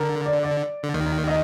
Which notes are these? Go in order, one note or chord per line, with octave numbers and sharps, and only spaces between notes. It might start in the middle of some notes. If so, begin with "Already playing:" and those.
Already playing: D3 A#4
D5
D5
D3
D#2 D#3
D#5